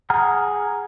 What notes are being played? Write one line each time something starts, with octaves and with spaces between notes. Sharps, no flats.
G#4 F#5 A#5 F6